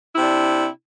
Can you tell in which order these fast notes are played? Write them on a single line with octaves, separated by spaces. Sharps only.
E4 C3 D4